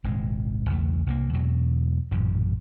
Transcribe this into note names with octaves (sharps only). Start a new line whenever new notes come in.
D#1 G#1 C3 G#3
B1 E2 C#3 A3
C2 G3 A#3
E2 B2 F#3
A1 F#2 A#2 C#3